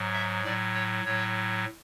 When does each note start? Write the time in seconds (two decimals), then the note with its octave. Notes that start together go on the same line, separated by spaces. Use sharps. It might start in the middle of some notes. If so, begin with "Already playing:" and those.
Already playing: G#2 F#3
0.14 E5
0.44 A2 F#3 D5
0.74 C#5
1.05 A2 F#3 C#5